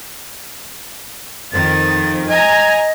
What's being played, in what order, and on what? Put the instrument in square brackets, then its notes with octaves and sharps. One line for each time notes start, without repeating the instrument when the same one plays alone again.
[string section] F2 D#3 [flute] A6
[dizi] D#5 [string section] G#5 A#5 [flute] G#6